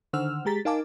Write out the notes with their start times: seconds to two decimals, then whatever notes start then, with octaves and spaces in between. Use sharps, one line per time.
0.13 D3 D#3 C5 F#5 E6 F6
0.45 G#3 G4 G#4 A#5 A6 B6
0.65 D#4 A#4 F5 G#5 A5 D6